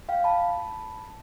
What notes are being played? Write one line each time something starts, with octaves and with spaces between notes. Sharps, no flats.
F5 G5
A5 B5